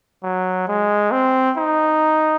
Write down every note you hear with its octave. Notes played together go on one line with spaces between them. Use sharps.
F#3
G#3
C4
D#4